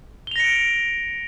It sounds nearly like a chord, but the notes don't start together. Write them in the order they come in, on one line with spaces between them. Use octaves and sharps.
G7 F7 A#6 C#7 D7